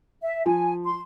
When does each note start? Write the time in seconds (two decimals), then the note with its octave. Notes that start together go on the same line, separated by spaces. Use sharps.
0.22 E5
0.46 F3 G#5
0.84 C6